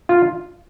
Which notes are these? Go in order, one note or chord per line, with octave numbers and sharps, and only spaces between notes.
F4